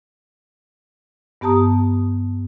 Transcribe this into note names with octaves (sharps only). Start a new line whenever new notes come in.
G2 B3 G4 A5 A#5 D#6